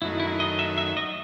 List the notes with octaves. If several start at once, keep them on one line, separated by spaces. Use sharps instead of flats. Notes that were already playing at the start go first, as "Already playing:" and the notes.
F#2 D#3 F#3 A3 D#4 E4
E4
D#5
E5
E5
D#5